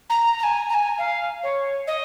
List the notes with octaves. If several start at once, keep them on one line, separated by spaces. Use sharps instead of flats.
A#5
A#5
G#5
A#5
G#5
F5
C#5
D#5